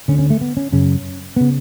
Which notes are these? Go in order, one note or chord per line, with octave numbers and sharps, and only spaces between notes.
D2 D3 C#4
C#4
A3
B3
C#4
F#2 C#3 C#4
C#3 B3